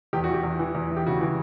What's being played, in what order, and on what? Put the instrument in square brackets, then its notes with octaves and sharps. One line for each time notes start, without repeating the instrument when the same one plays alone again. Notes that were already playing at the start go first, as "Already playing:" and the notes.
[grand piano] E2 G4
F#4
E3
G4
E2
E3
E2
E3
G4
C#3 F#4
E3